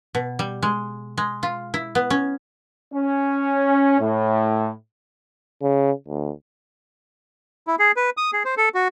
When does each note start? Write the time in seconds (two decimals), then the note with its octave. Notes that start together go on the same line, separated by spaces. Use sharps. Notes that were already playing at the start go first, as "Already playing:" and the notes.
0.15 B2
0.39 G3
0.62 G#3
1.17 G#3
1.43 F4
1.74 E4
1.95 B3
2.10 C#4
2.94 C#4
4.00 A2
5.62 C#3
6.08 D2
7.67 E4
7.79 G#4
7.96 B4
8.17 D#6
8.33 G#4
8.45 C5
8.57 A4
8.74 F#4